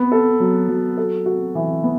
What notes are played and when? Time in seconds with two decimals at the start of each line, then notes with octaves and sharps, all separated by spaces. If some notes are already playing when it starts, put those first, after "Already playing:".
Already playing: B3
0.12 A4
0.40 F#3
0.69 F#3
0.97 A4
1.26 F#4
1.55 E3
1.83 B3